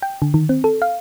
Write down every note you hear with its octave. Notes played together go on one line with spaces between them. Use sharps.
G5
D3
D#3
C4
A4
F5